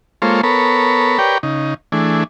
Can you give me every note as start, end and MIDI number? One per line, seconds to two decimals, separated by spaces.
0.22 0.41 56
0.22 0.41 58
0.22 0.41 65
0.22 0.41 69
0.22 0.41 72
0.22 0.41 73
0.43 1.18 59
0.43 1.18 69
0.43 1.18 70
0.43 1.18 73
0.43 1.18 83
1.18 1.38 67
1.18 1.38 70
1.18 1.38 71
1.18 1.38 73
1.18 1.38 74
1.18 1.38 79
1.43 1.74 49
1.43 1.74 63
1.92 2.24 52
1.92 2.24 57
1.92 2.24 62
1.92 2.24 68